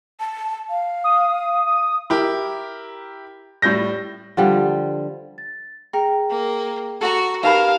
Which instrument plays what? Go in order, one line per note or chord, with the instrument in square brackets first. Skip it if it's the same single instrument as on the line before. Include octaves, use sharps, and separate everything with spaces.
[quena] A5
F5
[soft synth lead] D#6
D#6
[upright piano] E4 G4 A#4
A2 G3 G6 A#6
[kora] D3 F3 G3
[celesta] A6
[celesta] G#4 G5 A#5 [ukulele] A#4
[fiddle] A#3
[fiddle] F#4 [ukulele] A4 F#5 A#5
[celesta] D#4 G4 E7 [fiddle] A#4 [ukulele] B4 A5 B5 [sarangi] F5